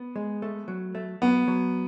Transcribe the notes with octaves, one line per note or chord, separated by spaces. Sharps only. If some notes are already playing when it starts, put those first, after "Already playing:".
Already playing: B3
G#3
A3
F#3
A3
F#3 B3
F#3